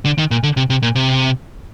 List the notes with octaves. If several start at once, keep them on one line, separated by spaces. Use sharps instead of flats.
D3
D#3
A#2
D3
C3
C3
A#2
C3